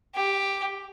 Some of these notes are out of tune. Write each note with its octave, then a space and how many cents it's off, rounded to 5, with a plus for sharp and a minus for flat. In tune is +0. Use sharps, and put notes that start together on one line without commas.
G4 +5